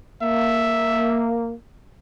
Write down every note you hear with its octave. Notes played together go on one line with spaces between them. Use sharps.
A#3 E5